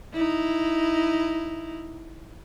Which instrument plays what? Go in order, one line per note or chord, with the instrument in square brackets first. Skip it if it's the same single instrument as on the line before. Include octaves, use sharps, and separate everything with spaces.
[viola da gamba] D#4 E4